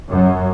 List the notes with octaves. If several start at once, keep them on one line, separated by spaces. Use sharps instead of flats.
F#2